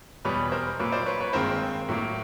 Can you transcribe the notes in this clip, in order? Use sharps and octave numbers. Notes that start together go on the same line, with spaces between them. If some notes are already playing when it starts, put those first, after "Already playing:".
E2 B2 G3 B4 C#5
A#4 C5
A#2 F#3 A#3 B4 C#5
C5 D5
B4 C#5
B4 C#5
G2 D#3 G#3 C4 A#4 C5
A2 F#3 A#3